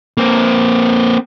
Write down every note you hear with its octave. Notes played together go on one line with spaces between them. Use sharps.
A#3 C4